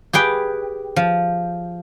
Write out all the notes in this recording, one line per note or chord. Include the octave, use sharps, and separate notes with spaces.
G4 G#4 B4 G5
F3